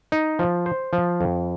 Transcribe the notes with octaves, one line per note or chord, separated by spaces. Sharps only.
D#4
F3
C5
F3
F2